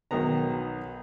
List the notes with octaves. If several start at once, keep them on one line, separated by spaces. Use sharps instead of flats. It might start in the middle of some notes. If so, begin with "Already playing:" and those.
B1 D#3 F#3 B3 A#5